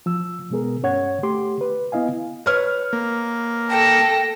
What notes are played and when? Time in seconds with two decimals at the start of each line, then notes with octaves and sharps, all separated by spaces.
0.06 F3 E6
0.50 B2 G#3 B3 G#4 A#4
0.83 G2 C#4 C#5 F#5 G#6
1.23 A3 G4 C6 D6
1.61 B4
1.92 B3 E4 D#5 F5 G#5
2.46 B4 C#5 F6
2.93 A#3
3.71 A4 G5 A#6